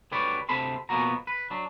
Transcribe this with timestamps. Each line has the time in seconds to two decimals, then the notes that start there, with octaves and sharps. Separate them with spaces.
0.11 D2 D3 G4 B4 C#5 D5
0.49 D2 C3 C4 A4 B5 C6
0.89 F2 B2 A#3 B3 F#4 A#5
1.27 B4
1.50 F#3 D4